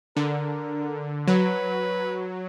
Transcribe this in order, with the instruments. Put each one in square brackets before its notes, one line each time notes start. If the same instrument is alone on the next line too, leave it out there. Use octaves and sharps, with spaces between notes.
[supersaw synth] D3 [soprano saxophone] A#4
[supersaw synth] F#3 [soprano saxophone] B4